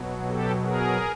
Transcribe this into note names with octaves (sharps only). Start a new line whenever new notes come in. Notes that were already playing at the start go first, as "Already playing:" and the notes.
Already playing: B2 F#3
G4 A4
G#4 A#4